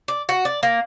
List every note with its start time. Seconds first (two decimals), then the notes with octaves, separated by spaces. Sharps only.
0.08 D5
0.29 F#4
0.45 D5
0.63 A#3